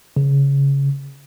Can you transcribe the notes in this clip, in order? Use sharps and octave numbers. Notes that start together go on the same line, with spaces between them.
C#3